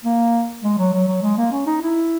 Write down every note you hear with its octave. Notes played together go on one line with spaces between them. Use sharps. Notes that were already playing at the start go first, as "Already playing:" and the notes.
A#3
G#3
F#3
F#3
F#3
G#3
A#3
C#4
D#4
E4